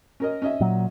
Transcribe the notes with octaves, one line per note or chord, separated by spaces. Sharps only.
C#4 A#4 D#5
C#4 D#5 E5
A#2 F#3